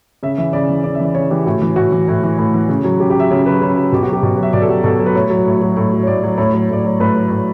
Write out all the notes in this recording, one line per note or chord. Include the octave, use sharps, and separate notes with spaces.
C#3 E5
E3 E5
C#3 D5
E3
C#3 D5
E5
E3
D5
C#3 C#5
E3 G4
A2 F#4
E3
A2 F#4
E3
A2
E3
A2
E3
C#3
F#3
C#3 G4
G4
F#3 E5
C#3 C#5
F#3 B4
C#3
F#3
B2 G4
F#4
F#3 G4
B2
F#3 E5
B2 D5
A4
F#3 G4
B2 A4
F#3
B4
A2 C#5
F#3
A2
F#3
A2
F#3
C#5
A2 D5
F#3
A2 C#5
F#3
A2 D5
F#3 C#5
A2 B4
F#3
A2